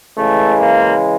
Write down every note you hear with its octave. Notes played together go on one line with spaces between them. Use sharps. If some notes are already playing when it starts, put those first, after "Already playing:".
C#3 E3 G#3 A3
A#3